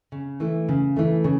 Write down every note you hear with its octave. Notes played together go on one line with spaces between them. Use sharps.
C#3
E3 A3
C#3
E3 A3
C#3